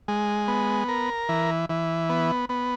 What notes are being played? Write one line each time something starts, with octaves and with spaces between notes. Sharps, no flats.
G#3
B3
A#4
E3
E3
B3
B3